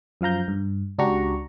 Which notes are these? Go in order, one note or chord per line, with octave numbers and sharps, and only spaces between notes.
F#2 F3 F5 A#5 G6
G2
C#2 D4 F#4 G4 A#5 C#6